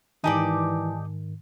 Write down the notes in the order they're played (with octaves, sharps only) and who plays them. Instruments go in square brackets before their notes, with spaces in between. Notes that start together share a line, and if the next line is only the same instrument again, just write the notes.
[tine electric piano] G#2 D#3 [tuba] E3 [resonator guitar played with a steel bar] D#4 G4 D5 [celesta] G#5 A5